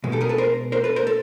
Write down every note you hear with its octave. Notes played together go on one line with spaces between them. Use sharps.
B2 G#3
G4 A4
G#4 A#4
A4 B4
A#4 C5
A#4 C5
A4 B4
A#4 C5
A4